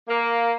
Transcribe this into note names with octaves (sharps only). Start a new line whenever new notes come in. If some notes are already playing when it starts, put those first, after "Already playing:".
A#3